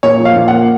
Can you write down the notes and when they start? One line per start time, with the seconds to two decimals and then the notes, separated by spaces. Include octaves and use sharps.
0.03 A#2 C#5
0.20 F3
0.25 F5
0.36 A#2
0.48 F#5
0.53 A#3